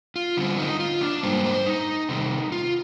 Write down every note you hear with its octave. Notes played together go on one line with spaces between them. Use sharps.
F4
D3 G3 C4
D#4
F4
D4
G#2 G3 A#3 C5
C5
D#4
C3 D#3 G3 C4
F4